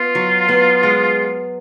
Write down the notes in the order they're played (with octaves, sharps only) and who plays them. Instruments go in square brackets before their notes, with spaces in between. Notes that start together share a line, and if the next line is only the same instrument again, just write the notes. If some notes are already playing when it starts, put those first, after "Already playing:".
Already playing: [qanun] B3 [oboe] F4
[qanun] F#3
B3
G#3